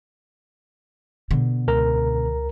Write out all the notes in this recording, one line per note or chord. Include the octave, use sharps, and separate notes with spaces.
B2 D3
C#2 A#4 A#5